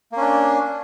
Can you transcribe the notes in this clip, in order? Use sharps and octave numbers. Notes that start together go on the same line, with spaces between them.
A#3 C#4 D4